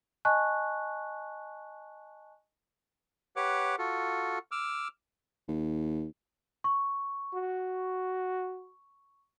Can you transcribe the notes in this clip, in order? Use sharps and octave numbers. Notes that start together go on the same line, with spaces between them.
D#5 G#5 A5 C#6 F#6
G4 B4 C#5 F#5 D6
F4 F#4 A4
D6 E6 F6
D#2
C#6
F#4